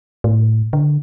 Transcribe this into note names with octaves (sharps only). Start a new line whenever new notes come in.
A2
D3